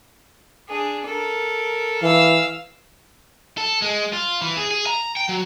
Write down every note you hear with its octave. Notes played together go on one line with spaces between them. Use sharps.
D4 G#4
A4 A#4
E3 F5 E6
A4
G#3
F4
E3
G#4
G#4
A#5
G5
F#3